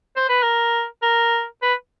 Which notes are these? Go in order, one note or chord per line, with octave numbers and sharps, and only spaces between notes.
C5
B4
A#4
A#4
B4